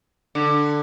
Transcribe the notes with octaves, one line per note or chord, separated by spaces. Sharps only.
D3